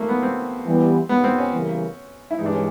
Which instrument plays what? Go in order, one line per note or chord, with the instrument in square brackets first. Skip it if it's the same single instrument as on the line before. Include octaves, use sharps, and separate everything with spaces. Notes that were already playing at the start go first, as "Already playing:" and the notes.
Already playing: [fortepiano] A3 A#3
B3
C4
[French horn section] E3 G3 B3
[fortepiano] B3
C4
C#4
[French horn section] C#3 E3 G3 A#3
[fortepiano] E4
[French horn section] G2 E3 G#3 [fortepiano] D#4
[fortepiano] D4
C#4